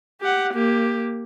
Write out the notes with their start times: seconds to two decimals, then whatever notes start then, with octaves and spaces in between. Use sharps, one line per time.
0.21 G4 F#5
0.54 A#3 G4